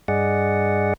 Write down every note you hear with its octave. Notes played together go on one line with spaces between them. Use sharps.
G2 G#4 D5 D#5 F#5